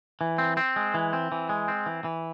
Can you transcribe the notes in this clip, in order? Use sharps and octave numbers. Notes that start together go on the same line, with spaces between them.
E3
C4
C4
G#3
E3
C4
E3
G#3
C4
E3
E3